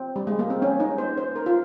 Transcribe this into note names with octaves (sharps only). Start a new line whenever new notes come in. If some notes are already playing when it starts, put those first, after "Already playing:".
Already playing: C4
G3
G#3
A#3
C4
C#4
D#4
C5
C5
A#4
F4